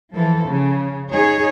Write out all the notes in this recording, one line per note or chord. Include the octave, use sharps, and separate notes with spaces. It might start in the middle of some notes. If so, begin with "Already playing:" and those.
E3 F3 A4
C#3
D#4 G#4 C#5